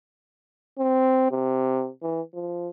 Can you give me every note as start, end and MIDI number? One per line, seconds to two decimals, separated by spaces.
0.78 1.30 60
1.31 1.89 48
2.02 2.21 52
2.34 2.69 53